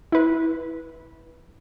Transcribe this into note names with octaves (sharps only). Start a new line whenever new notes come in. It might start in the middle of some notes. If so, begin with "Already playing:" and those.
E4 B4